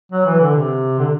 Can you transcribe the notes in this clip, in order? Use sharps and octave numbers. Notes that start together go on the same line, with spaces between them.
F#3
E3
D3
C3
D3